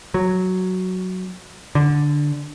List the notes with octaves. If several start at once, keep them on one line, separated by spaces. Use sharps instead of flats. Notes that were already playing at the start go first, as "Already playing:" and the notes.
F#3
D3